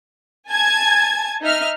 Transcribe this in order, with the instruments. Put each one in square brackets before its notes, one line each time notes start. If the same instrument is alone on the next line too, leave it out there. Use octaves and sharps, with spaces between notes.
[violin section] G#5 A5 G#6
D#4 E5 F6